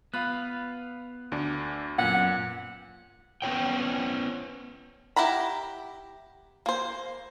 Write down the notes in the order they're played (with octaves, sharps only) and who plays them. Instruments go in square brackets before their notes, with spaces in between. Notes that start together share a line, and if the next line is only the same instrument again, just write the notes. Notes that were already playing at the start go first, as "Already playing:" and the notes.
[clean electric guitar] B3 F4 B4 [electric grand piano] F5 F#6
[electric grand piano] D2 D4
[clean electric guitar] F#2 B3 C#4 [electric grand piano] A#2 [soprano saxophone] F#5
[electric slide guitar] B3 C#4 F#4 C#5 G5
[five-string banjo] E4 G4 F#5 A#5 B5
A#3 C5